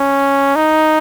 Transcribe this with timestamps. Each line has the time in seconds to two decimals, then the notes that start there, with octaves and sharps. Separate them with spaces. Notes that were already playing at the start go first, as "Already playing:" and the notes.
Already playing: C#4
0.56 D#4